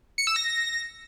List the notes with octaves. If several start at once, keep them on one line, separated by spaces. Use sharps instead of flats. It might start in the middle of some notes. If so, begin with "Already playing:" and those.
C#7
E6
A#6